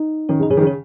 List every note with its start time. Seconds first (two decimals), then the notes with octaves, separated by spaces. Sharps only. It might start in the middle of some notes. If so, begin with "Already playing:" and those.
Already playing: D#4
0.29 D#3 C#4
0.39 C#3
0.43 D#4
0.50 C#3 C#4
0.57 D#3
0.61 C#3
0.67 C#4